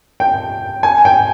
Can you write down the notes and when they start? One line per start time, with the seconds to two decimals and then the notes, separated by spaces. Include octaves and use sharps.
0.20 G5
0.83 G#5
1.05 G5